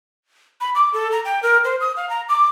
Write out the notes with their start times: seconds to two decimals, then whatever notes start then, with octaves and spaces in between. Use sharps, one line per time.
0.61 B5
0.75 D6
0.94 A4
1.12 A#5
1.25 G5
1.43 A#4
1.65 C5
1.81 D#6
1.96 F5
2.09 A#5
2.29 D6